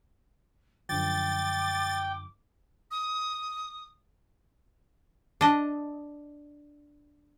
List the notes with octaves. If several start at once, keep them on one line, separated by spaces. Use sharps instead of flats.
F#2 D3 F3 G5 D6 A6
D#6
D4 D#5